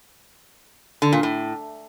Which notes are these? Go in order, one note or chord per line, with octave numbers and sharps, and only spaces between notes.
D3
A#2
A2